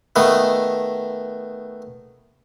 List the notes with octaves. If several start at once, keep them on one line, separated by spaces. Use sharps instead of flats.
D#3 A3 B3